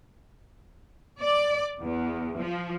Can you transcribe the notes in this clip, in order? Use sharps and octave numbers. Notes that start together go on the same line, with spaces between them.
D5
E2
F3